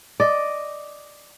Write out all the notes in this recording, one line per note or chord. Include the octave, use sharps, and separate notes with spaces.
D5 D#5